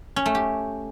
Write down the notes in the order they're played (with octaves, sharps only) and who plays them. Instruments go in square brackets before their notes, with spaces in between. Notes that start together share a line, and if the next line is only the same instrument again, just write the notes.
[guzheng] C#4
A3
G4